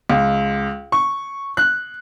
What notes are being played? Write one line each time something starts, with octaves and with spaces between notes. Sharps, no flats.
C#2
C#6
F#6